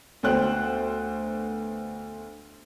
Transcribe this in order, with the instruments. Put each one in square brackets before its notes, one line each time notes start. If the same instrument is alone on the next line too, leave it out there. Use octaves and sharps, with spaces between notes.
[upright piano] D2 B3 C5 G5 F#6